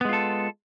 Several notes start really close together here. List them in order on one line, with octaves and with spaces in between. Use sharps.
B3 G#3 F4 A4